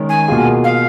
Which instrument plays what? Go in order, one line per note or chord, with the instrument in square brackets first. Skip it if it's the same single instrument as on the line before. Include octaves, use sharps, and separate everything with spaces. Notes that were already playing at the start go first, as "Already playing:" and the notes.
Already playing: [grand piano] D#3 G#3 C#4
[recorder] G#5
[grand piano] B2 A#3 F4 G#4
[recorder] F5